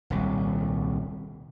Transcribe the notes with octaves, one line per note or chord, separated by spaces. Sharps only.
D#1 C2